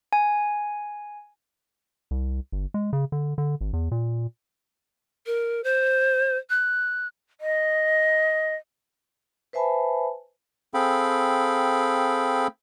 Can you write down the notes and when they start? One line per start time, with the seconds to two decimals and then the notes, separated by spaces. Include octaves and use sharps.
0.13 G#5
2.11 C2
2.52 G1
2.74 G#3
2.93 C#3
3.12 D3
3.38 D3
3.61 G#1
3.73 E2
3.91 A#2
5.26 A#4
5.64 C5
6.50 F#6
7.41 D#5
9.53 B4 C5 E5 G#5 A5 B5
10.74 C4 G#4 A4 F5 G5 B5